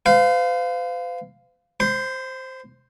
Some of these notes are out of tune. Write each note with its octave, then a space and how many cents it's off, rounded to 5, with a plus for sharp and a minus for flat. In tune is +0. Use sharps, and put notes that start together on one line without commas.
C5 -45 F5 +0
C5 +0 C6 -40